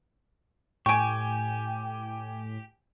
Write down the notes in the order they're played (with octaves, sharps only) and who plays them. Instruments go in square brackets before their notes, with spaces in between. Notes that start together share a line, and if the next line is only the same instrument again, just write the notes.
[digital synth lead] A2 [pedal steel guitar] G4 [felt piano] G5 G#5 [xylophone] C#6 D7